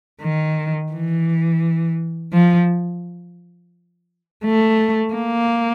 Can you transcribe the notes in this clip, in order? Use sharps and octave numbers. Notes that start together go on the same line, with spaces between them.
D#3
E3
F3
A3
A#3